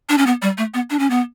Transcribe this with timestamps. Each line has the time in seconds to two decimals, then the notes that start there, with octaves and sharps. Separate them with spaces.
0.09 D4
0.18 C#4
0.26 B3
0.42 G3
0.58 A3
0.74 B3
0.90 D4
0.99 C#4
1.10 B3